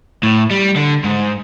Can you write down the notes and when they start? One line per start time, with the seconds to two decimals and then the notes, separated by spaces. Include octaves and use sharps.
0.23 A2
0.51 G3
0.76 D3
1.04 G#2